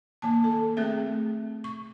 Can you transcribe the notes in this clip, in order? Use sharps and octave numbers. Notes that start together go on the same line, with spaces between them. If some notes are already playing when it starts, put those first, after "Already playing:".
D#3 A#3 A5
A4
A3 C4 G#4 E5
C#6